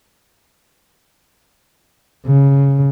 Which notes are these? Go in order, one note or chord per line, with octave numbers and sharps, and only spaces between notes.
C#3